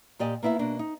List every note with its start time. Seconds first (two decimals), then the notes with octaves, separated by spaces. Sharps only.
0.19 A#2 G4 D5 D#5 G#5
0.43 A#3 B3 E4 D#5 E5
0.59 B2 A#3 D4
0.79 D#4